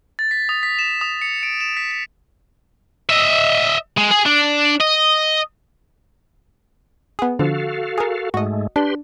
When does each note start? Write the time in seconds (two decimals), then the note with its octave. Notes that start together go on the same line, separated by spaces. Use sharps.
0.19 A6
0.31 B6
0.49 D#6
0.63 B6
0.79 E7
1.01 D#6
1.21 C#7
1.43 D7
1.61 E7
1.77 B6
1.91 B6
3.09 D#5 E5
3.98 G#3
4.11 G#4
4.26 D4
4.80 D#5
7.19 B3 G#4
7.39 D3 F3 F#4 A4 F5
7.98 G#4 A#4
8.34 G#2 G#3 A3 F#4 D#5
8.76 D4 G4 B4 C6